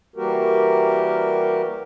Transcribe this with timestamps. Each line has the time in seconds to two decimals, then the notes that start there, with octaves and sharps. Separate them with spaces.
0.16 E3 G3 A#3 F#4 G4 A#4